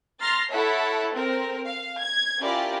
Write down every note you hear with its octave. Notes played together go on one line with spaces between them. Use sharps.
A#5 C6 F6 A6 A#6 C7
E4 A4 C#5 E5 F#5 A5
C4 A#4
F5
G#6
C#4 E4 F4 G4 A#4 D5